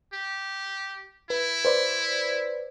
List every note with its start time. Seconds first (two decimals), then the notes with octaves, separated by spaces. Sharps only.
0.13 G4
1.30 E4 B4
1.65 B4 C5 D5